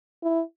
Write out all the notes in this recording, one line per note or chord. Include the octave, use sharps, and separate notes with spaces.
E4